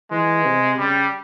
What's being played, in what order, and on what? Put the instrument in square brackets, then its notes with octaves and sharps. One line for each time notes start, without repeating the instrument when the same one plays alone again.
[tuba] E3 [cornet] G#3
[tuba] C3
[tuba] C#3 [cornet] G3